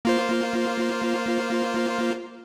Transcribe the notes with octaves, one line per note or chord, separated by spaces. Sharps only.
A#3 F4 C5